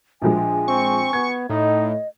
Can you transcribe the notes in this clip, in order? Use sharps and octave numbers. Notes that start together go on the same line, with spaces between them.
A#1 F3 G#3 G#5
C4 C#6
B3 G#6
A2 D#4 D#5